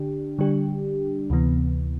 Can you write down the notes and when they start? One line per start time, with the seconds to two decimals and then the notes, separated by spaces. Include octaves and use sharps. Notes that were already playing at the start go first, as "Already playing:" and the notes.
Already playing: D3 D4 G4
0.38 D3 G3 D4 G4
1.30 D2 C3 E3 B3